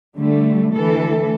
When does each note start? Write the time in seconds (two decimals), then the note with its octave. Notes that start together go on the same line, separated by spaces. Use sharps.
0.16 D3 G3 A3
0.73 D2 E3 A4